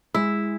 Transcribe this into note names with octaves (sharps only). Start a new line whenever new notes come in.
G#3 E4